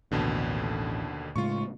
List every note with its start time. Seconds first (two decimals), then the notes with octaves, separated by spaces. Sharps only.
0.12 A1 D#2 B2 D3
1.36 A2 C#3 G#3 F4 C#6